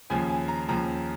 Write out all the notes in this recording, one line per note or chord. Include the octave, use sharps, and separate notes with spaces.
D#2 C#3 F3 G#5
G#5
A#5
D#2 C#3 F3 A#5